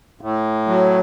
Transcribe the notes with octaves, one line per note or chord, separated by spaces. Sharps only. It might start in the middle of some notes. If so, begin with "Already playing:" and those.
A2
F#3